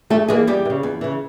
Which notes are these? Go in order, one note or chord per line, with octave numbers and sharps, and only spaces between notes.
G2 A3 A4
E3 G3 G#3 A#3 G#4
E2 G3 G4
E3
C#3
E2
C#3 E3